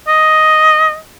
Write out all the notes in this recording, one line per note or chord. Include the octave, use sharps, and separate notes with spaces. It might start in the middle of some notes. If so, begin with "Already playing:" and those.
D#5